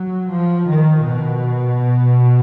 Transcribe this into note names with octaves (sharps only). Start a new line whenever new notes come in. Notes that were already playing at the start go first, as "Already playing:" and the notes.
Already playing: F#3
F3
D#3
B2